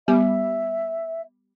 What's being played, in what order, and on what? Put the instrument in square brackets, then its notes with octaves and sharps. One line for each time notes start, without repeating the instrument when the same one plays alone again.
[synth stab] G3 [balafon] B3 [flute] E5